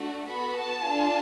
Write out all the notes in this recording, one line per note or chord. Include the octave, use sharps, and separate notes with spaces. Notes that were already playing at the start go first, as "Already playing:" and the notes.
Already playing: A3 D4 F#4
B3 F#4 A4 B5
A5
D4 F4 A4